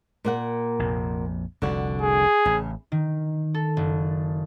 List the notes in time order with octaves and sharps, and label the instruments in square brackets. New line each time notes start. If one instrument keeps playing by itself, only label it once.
[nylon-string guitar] A#2 A#3 F#5
[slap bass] A#1 F2 C3
[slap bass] F1 C2 [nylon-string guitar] D3 F#4
[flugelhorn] G#4
[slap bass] A1 [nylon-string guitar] C#3
[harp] D#3
A4
F#1